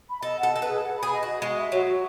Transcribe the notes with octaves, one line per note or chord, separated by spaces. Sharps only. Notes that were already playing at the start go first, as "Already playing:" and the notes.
B5
A4 D#5
A4 F#5
A4 D#5
B4
G#4
F#5
G#4 B5
D#5
F#4 D#5
G#3 F#4
E5
F#3 F#4
F#4